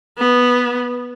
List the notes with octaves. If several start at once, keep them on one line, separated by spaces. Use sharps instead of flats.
B3